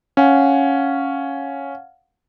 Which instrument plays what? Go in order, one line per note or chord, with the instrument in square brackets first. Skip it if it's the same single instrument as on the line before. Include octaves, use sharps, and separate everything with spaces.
[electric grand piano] C#4 [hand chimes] F5 F#5 G#5